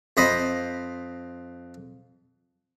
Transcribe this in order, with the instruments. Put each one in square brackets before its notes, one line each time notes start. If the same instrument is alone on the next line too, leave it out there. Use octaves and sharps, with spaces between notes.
[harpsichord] F2 C5 D#5 B5